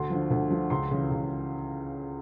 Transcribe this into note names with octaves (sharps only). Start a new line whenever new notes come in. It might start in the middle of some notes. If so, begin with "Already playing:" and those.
Already playing: D2 C6
D3 F3
D2
D3 F3
C#2 C6
C#3 E3
C#2